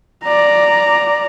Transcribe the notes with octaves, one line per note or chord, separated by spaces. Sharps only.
D5 A#5